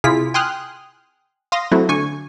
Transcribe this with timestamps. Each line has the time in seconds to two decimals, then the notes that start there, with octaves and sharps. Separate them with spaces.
0.04 C3 E4 F4 G#4 B6
0.34 G5 G#5 C6 D#6 F6 F#6
1.52 F5 C6 D#6 A#6
1.71 F#3 A3 C4 E4 F#4
1.89 D3 G#5 C#6 G#6